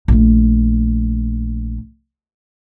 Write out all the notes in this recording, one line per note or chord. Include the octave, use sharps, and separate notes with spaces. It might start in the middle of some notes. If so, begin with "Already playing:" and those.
A#1 A3